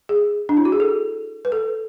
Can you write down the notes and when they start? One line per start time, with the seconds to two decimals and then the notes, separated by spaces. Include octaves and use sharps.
0.09 G#4
0.49 D4
0.57 E4
0.65 F#4
0.72 G#4
0.80 A4
1.45 B4
1.52 A4